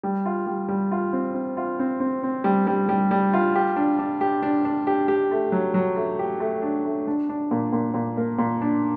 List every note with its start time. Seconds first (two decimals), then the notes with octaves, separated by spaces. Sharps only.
0.03 G3
0.25 F4
0.47 G3
0.69 G3
0.91 F4
1.13 C4
1.34 C4
1.57 F4
1.79 C4
2.00 C4
2.23 C4
2.44 G3
2.67 G3
2.89 G3
3.11 G3
3.33 F4
3.55 G4
3.76 D4
3.99 D4
4.21 G4
4.43 D4
4.65 D4
4.87 G4
5.08 G4
5.31 A3
5.52 F#3
5.74 F#3
5.96 A3
6.19 G4
6.40 A3
6.62 D4
6.85 A3
7.07 D4
7.29 D4
7.51 A#2
7.73 A#2
7.94 A#2
8.17 A#3
8.39 A#2
8.61 D4